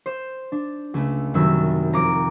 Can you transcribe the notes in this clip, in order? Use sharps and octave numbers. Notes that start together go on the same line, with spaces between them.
C5 E7
D4
C#2 A3
C2 F#2 D#3 B4 E5 E6
F2 A#5 D6 D7